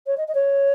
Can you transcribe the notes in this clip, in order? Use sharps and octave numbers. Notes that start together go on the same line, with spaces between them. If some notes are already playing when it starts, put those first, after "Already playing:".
C#5
D#5
D#5
C#5